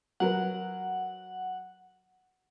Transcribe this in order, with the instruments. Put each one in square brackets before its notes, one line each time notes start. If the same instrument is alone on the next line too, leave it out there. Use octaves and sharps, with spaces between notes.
[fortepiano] F#3 A#4 B4 [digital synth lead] F#5